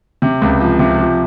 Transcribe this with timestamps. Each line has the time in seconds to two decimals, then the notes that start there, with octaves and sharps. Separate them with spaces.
0.22 C3
0.42 C#2
0.61 F3
0.79 C3
0.99 F3